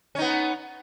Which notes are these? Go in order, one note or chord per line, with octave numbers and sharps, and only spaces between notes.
B3 C#4 D#4